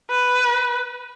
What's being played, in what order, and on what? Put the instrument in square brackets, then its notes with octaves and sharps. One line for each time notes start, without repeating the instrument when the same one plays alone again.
[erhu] B4